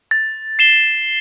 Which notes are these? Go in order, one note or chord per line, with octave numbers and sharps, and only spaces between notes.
A6
C7 E7 G7